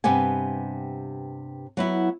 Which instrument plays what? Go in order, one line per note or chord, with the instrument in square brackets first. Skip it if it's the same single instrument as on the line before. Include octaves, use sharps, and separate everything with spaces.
[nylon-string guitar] G2 C3 B3 G4 G#5
F#3 B3 E4